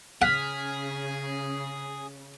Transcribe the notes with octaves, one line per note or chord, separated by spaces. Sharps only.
C#3 G#4 F#5 F6 B6